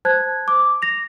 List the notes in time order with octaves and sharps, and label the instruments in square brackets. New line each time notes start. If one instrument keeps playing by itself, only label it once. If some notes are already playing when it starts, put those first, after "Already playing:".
[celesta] C5 A5 F#6 G#6
D6
A#6 F7